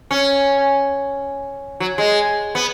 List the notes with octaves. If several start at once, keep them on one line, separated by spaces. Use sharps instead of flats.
C#4
F#3
G#3
B3